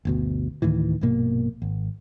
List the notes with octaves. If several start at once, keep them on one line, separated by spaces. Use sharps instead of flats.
G1 D2 B2
D2 A2 D#3 E3
A#1 G2 B2 A#3
G#1